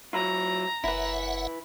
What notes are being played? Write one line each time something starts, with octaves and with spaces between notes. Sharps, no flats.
F#3 E4 F4 A#5
F#1 E4 B4 E5 F#5